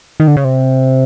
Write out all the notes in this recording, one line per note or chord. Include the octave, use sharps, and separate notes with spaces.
D#3
D3
C#3
C3